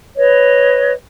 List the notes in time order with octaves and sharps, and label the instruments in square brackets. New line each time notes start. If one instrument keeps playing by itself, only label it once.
[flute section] B4 C#5 D#5